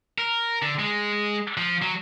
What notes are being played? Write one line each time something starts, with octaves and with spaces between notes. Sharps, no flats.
A#4
D3
G#3
F3
F#3